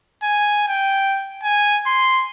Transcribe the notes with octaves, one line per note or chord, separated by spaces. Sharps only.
G#5
G5
G#5
C6